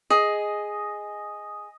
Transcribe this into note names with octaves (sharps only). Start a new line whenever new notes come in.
G#4 D#5